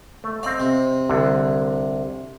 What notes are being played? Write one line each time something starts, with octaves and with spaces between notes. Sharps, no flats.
A3
C4 D5 D#5 F5
C3
C2 D3